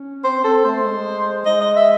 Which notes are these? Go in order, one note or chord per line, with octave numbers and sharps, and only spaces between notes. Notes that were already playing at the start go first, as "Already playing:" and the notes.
Already playing: C#4
C4 C5
C4 A4
A3 C5
G#3
G#3 D#5
D#5
E5